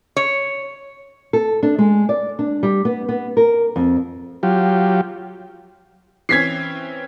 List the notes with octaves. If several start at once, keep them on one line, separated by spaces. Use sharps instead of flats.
C#5
A4
D4
G#3
D5
D4
G3
B3
B3
A#4
F2
F#3 F4 G4
E3 C4 C#4 G#6 B6 C7